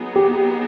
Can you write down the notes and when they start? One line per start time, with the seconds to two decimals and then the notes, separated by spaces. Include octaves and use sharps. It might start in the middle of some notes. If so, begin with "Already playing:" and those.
Already playing: F#3 B3 D#4 G#4
0.16 G4